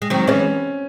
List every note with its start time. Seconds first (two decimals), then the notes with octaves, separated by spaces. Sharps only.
0.02 G#3
0.10 D#3 F#3 C4
0.27 E3 G#3 C#4